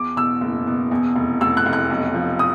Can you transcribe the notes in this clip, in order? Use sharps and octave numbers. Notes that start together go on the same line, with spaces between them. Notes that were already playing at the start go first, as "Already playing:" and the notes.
Already playing: E2 D6
B2 E6
F#1
B2
E2
F1
F1 E6
F#6
F1
F#6
B1
F3
D#6